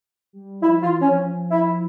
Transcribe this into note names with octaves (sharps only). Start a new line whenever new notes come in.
G3
F3 E4
E3 F4
F3 C#4
E4